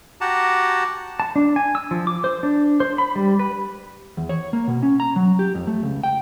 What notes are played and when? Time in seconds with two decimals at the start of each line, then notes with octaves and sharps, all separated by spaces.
0.21 F#4 G4 F#5 A5 A#5
1.20 A5
1.36 D4
1.56 G#5
1.75 E6
1.91 F3
2.07 D6
2.24 C5
2.43 D4
2.80 C5
2.98 B5
3.16 G3
3.39 B4
4.17 E2
4.29 C#5
4.53 A#3
4.68 B2
4.83 C#4
5.00 A#5
5.16 F#3
5.39 G4
5.55 F2
5.67 A3
5.83 C#2
6.03 G5